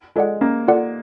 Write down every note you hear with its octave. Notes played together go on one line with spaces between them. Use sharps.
G#3 F4 A4 D5 F#5
A#3 C#4
F4 A4 D5 F#5